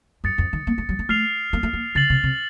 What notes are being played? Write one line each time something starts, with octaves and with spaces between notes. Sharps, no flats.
F#2 D#6 A6 C#7
F2
D#3
A#3
A3
F#3
A3
A3 F6 C7 F7
A#3
A3
A#3
C#3 A6 C7 F#7
C3
C3